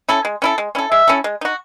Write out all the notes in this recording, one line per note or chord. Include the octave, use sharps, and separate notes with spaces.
C#4 E4 A4
G#3
C#4 E4 A4
G#3
C#4 E4 A4
G#3 E5
C#4 E4 A4
G#3
D#4 F#4